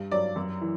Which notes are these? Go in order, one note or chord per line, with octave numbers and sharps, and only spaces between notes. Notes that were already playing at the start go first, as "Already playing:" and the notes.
Already playing: G2
F#3 D5
F#2
E3